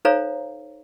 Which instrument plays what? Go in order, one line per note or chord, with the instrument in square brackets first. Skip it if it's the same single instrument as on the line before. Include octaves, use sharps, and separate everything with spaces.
[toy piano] D#4 A4 C5 C#5 F5 A#5